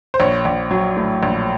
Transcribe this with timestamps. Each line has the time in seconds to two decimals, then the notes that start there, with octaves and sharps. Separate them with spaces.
0.14 C5
0.20 A#1 C#5
0.45 A#1
0.71 F#3
0.97 A2
1.23 A#1